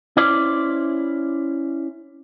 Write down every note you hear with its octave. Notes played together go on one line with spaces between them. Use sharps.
C#4 E4 C5 D5